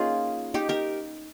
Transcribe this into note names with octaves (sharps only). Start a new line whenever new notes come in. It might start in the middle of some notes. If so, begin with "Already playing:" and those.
Already playing: A#3 C#4 D#4 F4 G#4
D#4 G4
G4 A#4